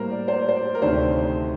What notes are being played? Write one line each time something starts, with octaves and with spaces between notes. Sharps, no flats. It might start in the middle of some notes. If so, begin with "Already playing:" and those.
Already playing: A2 G3 A#3 A#4 C5
D5
C5
C5
D5
A#4
D2 C3 D#3 A3 C5